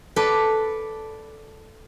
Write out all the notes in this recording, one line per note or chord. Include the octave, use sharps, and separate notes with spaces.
A4 B4 D5